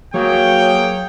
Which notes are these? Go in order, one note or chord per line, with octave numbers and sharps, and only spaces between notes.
F#3 A#3 G#4 C#5 G5